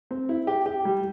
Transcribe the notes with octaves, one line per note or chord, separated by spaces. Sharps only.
C4
E4
G4
G4
G3